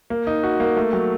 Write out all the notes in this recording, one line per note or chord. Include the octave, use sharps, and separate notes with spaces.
A#3
D#4
F#4
A#3
A3
F#3